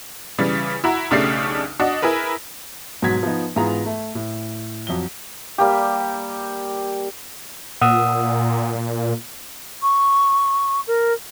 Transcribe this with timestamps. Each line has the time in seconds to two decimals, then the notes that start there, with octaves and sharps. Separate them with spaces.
0.39 C#3 E3 G3
0.84 E4 F#4 A#5
1.11 B1 C#3 A3 D4 G4 C7
1.80 D4 F#4 D#5
2.02 E4 G#4 A#4 B4
3.02 G#2 B2 F#3 G#6 B6
3.23 F3 B3 D#4
3.56 G#2 E3 B3 F4 G#4 A#5
3.86 A3
4.15 A2
4.87 F2 F#3 G7
5.58 G3 A#3 G4
7.81 A#2 F#5 D#6 E6
9.82 C#6
10.87 A#4